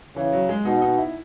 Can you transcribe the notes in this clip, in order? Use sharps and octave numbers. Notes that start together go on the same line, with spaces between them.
C#3 E3
F#3
G#3
B2 D#4
D#4
E4